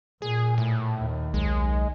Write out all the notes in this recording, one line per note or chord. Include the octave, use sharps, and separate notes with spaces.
A#2 G#4
A2
D#2
B1 G#3